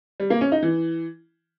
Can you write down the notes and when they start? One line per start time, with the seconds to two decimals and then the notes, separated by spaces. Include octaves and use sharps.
0.20 G3
0.30 A#3
0.41 C#4
0.52 D#4
0.63 E3